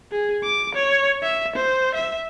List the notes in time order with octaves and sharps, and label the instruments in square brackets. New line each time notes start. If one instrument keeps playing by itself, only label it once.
[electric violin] G#4
D6
C#5
E5
C5
E5